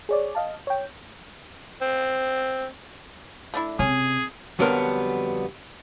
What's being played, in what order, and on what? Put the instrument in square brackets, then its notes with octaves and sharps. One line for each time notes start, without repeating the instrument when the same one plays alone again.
[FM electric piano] G#4 C#5 D5
D#5 F5 A5
C#5 G5
[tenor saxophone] C4
[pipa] A3 D4 E4
[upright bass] C3 [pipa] C#4 [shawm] G#4
[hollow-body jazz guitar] F2 D3 F#3 G3 B3 A#4